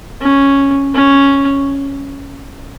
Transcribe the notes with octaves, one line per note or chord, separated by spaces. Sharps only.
C#4
C#4